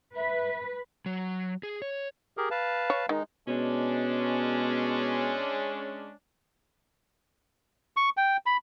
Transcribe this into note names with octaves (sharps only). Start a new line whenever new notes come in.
B4 E5
F#3
G#4
C#5
G4 G#4 A#4
B4 F5 A5
C#5
D#3 G#3 D#4
B2 G#3 C#4 D4
C#6
G5
B5